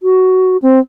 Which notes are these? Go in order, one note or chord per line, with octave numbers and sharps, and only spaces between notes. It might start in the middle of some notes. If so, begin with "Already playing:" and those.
F#4
C4